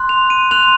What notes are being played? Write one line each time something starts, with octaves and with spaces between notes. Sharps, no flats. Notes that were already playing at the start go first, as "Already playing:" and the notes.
Already playing: C6 F#6
F7
D#7
C6 F#6 F7